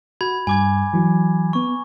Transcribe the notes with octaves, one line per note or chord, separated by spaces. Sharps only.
F#4 B5 G#6
G2 G#5 D6 G#6
E3 F#3
B3 G#5 C#6